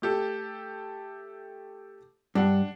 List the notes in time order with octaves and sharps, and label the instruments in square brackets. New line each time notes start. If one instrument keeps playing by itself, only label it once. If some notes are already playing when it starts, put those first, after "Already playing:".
[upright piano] A3 G4 A4
[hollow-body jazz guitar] G2 [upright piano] D4 F#5